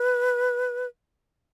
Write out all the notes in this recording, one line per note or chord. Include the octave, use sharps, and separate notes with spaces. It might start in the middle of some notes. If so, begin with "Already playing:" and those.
Already playing: B4